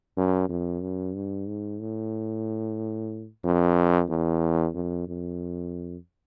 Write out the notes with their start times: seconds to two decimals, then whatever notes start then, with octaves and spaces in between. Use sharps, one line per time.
0.17 F#2
0.49 F2
0.82 F#2
1.15 G2
1.47 G#2
1.80 A2
3.44 F2
4.10 E2
4.75 F2
5.08 F2